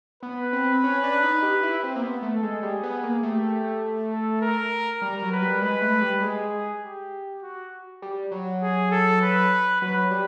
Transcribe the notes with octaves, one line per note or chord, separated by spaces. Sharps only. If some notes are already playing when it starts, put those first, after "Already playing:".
B3 B4
C4
C#4
D4
D#4
G4
E4
C4
A#3
B3
A3
A4
G#3
G3 G#4
B3
A#3
A3 G4
A4
A#4
G3 A#4
F#3
B4
G3
G#3 B4
A3
G3
G#3 G#4
G4
F#4
G3
F#3
G#4
A4
B4
F#3 B4
G3